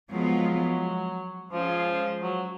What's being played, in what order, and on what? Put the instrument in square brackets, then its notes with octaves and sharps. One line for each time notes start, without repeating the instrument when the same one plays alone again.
[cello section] F3 G#3 B3 F4 [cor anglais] F#3
[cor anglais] F3 [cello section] G#3 C#4 F4 G#4
[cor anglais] F#3